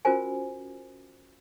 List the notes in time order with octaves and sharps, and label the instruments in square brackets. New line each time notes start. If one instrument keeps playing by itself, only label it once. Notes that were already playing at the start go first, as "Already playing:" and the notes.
[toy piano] C#4 F4 F#4 A#4 C5 G#5